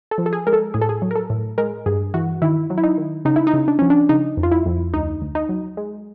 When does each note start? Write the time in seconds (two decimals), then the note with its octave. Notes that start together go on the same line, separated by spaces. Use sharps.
0.11 A4
0.18 F3
0.26 A4
0.33 G#4
0.47 G#3 A#4
0.53 A4
0.74 A2 G#4
0.82 A4
0.89 G#4
1.02 F#3
1.11 A#4
1.16 A4
1.30 A2
1.58 G#3 A#4
1.86 G2 G#4
2.14 E3 F#4
2.42 D#3 E4
2.70 F#3
2.78 E4
2.84 D#4
2.98 D#3
3.25 C#3 D#4
3.36 E4
3.47 D#4
3.54 C#3
3.68 D4
3.79 F3 C#4
3.90 D4
4.09 C#3 D#4
4.37 F2
4.43 F4
4.52 E4
4.66 F2
4.94 D2 D#4
5.21 D2
5.35 D#4
5.49 F#3
5.77 G#3